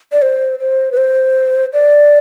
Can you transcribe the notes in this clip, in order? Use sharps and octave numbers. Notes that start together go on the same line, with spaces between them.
D5
C5
C5
B4
C5
D5